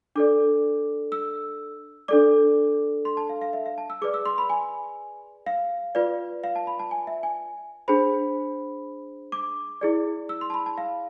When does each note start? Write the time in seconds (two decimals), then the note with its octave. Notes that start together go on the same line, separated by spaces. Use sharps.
0.16 D4 A4 D5 D6
1.12 E6
2.08 D4 A4 D5 D6
3.05 C6
3.17 A5
3.29 F5
3.41 F5
3.53 E5
3.66 F5
3.78 A5
3.90 E6
4.02 G#4 B4 D5 D6
4.14 E6
4.26 C6
4.38 B5
4.50 G#5
5.46 F5
5.95 F4 B4 D5
6.44 F5
6.56 A5
6.67 B5
6.79 A5
6.91 G#5
7.07 E5
7.23 G#5
7.88 D4 G#4 C5 B5
9.32 D6
9.81 E4 G#4 D5
10.29 E6
10.41 C6
10.50 A5
10.54 B5
10.66 A5
10.78 F5